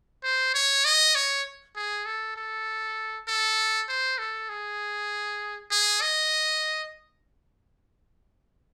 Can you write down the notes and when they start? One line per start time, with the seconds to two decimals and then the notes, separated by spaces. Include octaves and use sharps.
0.24 C5
0.54 C#5
0.85 D#5
1.15 C#5
1.76 G#4
2.06 A4
2.36 A4
3.28 A4
3.89 C5
4.19 A4
4.49 G#4
5.71 G#4
6.02 D#5